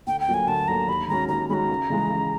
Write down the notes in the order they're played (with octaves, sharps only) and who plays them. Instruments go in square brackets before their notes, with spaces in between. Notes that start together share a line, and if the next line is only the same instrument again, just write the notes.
[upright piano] D2 [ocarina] G5
[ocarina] G5
[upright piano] D3 F#3 A#3
[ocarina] G#5
[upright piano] D2 [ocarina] A5
[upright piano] D3 F#3 A#3 [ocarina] A#5
[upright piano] D#2 [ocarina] B5
[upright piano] D#3 G#3 C#4 F#4 [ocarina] A#5
[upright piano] D#2 [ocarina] A#5
[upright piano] D#3 G#3 C#4 F#4 [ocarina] A#5 B5
[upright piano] C#2
C#3 E3 G#3
C#2